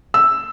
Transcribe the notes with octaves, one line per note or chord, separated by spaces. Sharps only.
E6